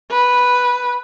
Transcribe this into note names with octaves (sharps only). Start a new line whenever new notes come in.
B4